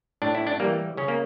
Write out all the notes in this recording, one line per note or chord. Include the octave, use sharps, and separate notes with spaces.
A2 D4
E4
D4
E3 G3 A#3
C#3 C#4
A#3